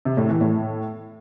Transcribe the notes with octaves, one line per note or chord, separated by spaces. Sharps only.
C3
A2
E3
A2